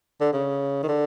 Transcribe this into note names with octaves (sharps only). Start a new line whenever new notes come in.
D3
C#3
D#3
D3